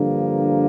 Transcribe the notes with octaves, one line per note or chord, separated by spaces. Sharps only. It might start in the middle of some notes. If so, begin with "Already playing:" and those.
Already playing: G2 D3 F3 A#3